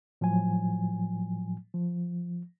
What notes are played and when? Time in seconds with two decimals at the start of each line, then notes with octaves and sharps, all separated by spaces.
0.21 A2 F3 F#3 G#5
1.74 F3